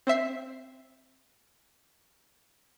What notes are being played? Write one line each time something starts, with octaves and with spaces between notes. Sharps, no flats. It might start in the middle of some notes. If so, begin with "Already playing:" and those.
C4 C5 E5 C7